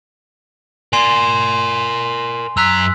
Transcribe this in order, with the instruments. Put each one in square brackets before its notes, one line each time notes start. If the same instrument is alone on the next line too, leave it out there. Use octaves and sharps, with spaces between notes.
[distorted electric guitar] A#4 D5 [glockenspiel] G#5 C6 C7
[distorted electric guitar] F#2 A#5 [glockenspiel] E6 F#6 B6